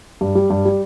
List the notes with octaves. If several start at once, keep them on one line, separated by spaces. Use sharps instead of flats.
G2
G3
G2
G3